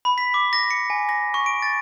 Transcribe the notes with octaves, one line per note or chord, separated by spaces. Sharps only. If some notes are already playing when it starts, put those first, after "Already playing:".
B5
B6
D6
A#6
C#7
G#5
A#6
C#6
D7
A6